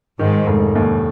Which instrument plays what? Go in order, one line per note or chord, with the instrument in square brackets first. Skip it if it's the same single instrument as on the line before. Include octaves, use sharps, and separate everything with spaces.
[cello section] G#2 [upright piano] D#3
[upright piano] F1
D#2